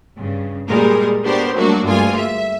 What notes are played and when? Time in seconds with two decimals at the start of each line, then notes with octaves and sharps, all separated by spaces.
0.18 G2 C#3
0.68 A#2 G3 G#3 A#4
1.24 B3 D4 F#4 G4 A#4 C5
1.53 F#3 G3 A3 A#3 D4 F#4
1.84 D2 G2 G#3 A#3 F4 G#5
2.17 E5